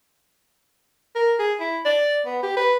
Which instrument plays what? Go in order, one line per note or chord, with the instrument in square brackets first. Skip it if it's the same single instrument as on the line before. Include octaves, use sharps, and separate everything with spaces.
[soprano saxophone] A#4
G#4
E4
D5
B3
G4
B4